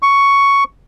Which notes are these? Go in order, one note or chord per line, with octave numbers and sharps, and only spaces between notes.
C#6